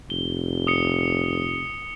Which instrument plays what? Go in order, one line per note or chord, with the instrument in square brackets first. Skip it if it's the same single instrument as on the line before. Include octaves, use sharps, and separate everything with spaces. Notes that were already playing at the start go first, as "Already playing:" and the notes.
[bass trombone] F1 [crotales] G7
[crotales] D#6 C#7